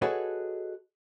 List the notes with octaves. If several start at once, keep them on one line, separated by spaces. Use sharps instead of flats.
F#4 G#4 A4 B4 C#5 D#5